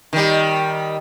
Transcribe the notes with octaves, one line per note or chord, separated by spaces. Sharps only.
D#3 G3